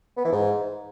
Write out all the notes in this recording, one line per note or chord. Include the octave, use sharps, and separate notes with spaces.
B3
E3
G#2